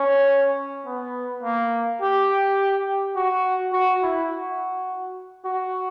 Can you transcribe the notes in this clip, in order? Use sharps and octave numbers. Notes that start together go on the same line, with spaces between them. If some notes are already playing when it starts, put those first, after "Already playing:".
Already playing: C#4
B3
A#3
G4
F#4
F#4
E4
F#4
F#4